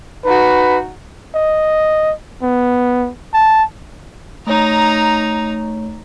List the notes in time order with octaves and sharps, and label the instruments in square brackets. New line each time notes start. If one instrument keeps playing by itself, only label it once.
[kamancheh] D#4 F#4 [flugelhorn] B4
[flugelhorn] D#5
B3
A5
[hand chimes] A3 C#5 [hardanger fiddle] D#4 A#5